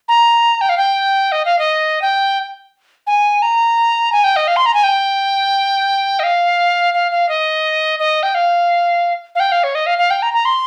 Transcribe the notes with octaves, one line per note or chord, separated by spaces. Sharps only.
A#5
G5
F5
G5
D#5
F5
D#5
G5
G#5
A#5
G#5
G5
D#5
F5
C6
A#5
G#5
G5
D#5
F5
F5
F5
D#5
D#5
G5
F5
F5
G5
F5
C#5
D#5
F5
F5
G5
A#5
A#5
C6